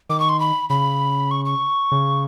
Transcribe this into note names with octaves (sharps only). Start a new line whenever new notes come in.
D#3 D6
C#6
C6
B5
C#3 B5
C#6
C#6
C#3